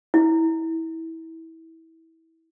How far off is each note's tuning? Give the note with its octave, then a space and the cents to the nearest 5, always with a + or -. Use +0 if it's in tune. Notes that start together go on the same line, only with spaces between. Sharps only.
E4 -20